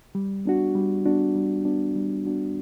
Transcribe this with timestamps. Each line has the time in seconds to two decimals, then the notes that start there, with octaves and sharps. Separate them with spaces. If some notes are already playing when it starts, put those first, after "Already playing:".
0.15 G3
0.45 B3 D4 F#4
0.75 G3
1.05 B3 D4 F#4
1.35 G3
1.65 B3 D4 F#4
1.95 G3
2.25 B3 D4 F#4